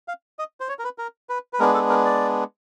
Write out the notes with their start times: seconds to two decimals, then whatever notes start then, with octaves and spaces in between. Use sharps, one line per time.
0.08 F5
0.39 D#5
0.60 C5
0.69 C#5
0.79 A#4
0.84 B4
0.98 A#4
1.29 B4
1.53 B4
1.60 G#3 B3 D4 A#4
1.74 A4
1.89 A#4
2.05 D5